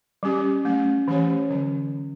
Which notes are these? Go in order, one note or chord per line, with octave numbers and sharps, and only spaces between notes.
G3 C#4 G4
F#3 A3 C#4
E3 A3 C#4 G4 C#5
D3 F#3 C#4